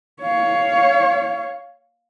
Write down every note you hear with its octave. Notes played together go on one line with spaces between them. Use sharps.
C#5 F5